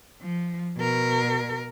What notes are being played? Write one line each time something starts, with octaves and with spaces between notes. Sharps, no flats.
F3
B2 A#4